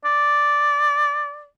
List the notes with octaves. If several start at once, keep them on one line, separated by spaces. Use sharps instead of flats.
D5